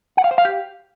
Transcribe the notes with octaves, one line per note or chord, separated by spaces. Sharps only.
F#5
F5
C5
F5
G4